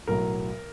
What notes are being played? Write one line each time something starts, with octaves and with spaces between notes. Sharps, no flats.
B1 A2 F#3 A#4